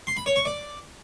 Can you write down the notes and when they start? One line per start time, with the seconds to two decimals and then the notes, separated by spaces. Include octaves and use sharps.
0.07 C6
0.17 B5
0.26 C#5
0.36 C#6
0.45 D5